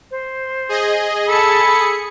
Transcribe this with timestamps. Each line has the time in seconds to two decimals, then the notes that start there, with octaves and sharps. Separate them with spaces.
0.11 C5
0.69 G#4 D#5
1.29 G#4 A4 A5 B5 C#7
1.67 D#6